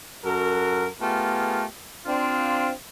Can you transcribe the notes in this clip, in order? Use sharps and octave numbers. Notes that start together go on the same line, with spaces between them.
F#2 F#4 A4 A#4
A3 B3 F4 G4 G#4 A#4
C4 D4 F4